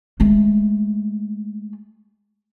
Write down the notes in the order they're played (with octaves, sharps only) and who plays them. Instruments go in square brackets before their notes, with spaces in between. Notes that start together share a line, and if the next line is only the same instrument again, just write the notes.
[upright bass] G#3 A3